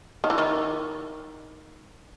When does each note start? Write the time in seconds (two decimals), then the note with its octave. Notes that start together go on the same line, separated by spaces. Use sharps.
0.24 D#3
0.30 E3
0.38 D#3